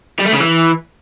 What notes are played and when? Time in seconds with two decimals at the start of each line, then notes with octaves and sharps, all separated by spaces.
0.19 G3
0.26 A3
0.33 C#3
0.40 E3